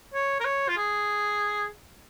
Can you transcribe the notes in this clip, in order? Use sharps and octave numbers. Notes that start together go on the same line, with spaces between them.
C#5
A#4
C#5
F4
G#4